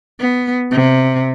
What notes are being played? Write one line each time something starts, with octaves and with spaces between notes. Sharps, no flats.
B3
C3